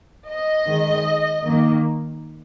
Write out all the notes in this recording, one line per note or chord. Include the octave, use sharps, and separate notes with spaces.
D#5
D#3 G#3
D#3 A#3